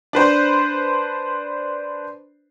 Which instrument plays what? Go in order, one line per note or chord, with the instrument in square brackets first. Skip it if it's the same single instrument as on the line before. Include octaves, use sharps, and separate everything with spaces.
[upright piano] D4 B4 C5